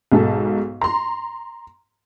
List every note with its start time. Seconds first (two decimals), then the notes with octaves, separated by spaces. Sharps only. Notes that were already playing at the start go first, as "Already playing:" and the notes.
0.12 B1 G#2 A4
0.81 A#5 C6